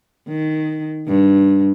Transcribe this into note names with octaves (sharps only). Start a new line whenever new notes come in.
D#3
G2